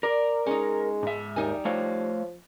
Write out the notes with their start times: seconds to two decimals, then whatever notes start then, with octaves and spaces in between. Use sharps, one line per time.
0.03 A#4 D5
0.46 G#3 C#4 D#4
1.03 G#2 E5
1.36 D#2 G3 D#4 G#5
1.65 F3 A3 C#5 F5